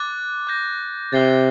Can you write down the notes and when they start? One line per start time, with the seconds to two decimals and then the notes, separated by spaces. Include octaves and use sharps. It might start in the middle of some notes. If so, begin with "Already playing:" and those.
Already playing: D6 F#6 A6
0.47 D6 G6 A#6
1.13 C3 A6 C7 G7